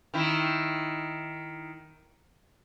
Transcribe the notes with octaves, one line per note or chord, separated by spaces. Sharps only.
D#3 E4